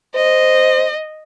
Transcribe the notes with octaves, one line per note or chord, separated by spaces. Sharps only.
C5 D#5